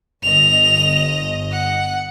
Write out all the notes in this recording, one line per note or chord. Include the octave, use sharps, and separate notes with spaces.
G1 D#5 F7
F#5